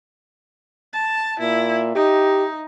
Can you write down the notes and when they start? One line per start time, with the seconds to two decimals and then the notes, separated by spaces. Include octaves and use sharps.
0.93 A5
1.40 A#2 E4
1.95 D#4 G4